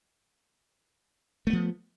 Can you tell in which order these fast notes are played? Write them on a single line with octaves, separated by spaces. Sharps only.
A3 B3 F3